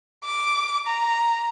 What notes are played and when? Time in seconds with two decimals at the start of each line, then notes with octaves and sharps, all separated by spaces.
0.24 D6
0.87 A#5